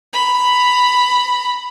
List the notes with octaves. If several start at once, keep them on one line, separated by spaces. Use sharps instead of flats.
A#5 B5